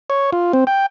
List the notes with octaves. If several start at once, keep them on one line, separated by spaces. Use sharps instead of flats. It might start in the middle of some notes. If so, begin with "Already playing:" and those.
C#5
F4
C4
G5